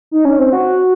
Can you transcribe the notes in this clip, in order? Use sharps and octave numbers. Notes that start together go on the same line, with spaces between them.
D#4
C#4
C4
F#4